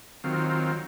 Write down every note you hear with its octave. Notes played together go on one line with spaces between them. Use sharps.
D#3 F#3 C4 F4